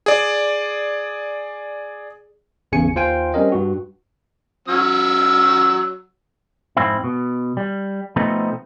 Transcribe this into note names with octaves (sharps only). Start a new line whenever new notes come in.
G#4 D5
G#1 E2 C#3 G#5 C#7
D#2 F4 C5 F5 G5 G#5
G3 C4 C#4 A#4 D#5
G2 F#4
F#3 C#4 E6
F2 G#2 C4 E4
B2
G3
B2 F3 A3 B3 C4 D#4